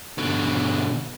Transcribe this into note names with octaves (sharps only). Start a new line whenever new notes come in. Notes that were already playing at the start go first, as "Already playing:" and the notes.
B2 D3